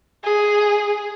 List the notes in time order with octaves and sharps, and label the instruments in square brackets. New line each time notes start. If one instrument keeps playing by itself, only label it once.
[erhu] G#4